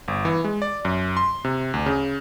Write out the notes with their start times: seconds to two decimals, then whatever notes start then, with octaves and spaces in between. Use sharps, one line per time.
0.08 G1
0.25 E3
0.44 G#3
0.62 D5
0.85 F#2
1.17 C6
1.44 C3
1.74 D2
1.86 C#3